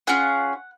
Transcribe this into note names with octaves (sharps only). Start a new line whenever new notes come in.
C#4 F4 G#4 F#5